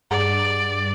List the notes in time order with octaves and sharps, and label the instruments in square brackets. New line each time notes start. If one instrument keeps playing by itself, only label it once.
[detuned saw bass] G2 [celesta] G#4 F#5 A#5 [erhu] D5